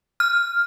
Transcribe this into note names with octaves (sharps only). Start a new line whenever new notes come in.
F6